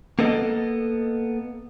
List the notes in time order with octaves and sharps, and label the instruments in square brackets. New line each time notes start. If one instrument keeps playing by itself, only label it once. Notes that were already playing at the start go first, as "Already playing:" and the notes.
[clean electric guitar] A#3 B3 A4 D#5